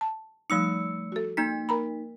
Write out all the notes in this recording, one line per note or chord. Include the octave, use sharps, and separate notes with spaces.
A5
F3 G3 A3 D#4 E6 C#7
F#4 A4
A#3 D#4 A#5 B6
A#4 A#5 B5